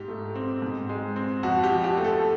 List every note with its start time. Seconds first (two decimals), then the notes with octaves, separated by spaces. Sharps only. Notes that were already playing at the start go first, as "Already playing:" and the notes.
Already playing: G#2 G4
0.08 A3
0.35 C4
0.62 G#2
0.89 G#3
1.16 C4
1.43 F2 F#4
1.64 G4
1.70 F3
1.84 G4
1.97 A3
2.04 A4